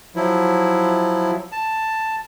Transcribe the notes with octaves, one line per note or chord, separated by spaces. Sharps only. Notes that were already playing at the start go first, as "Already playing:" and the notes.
F3 F#3 E4
A5